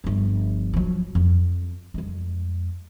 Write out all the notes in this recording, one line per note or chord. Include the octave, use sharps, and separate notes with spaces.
G1 F3
F3 F#3
F2
F2 G#3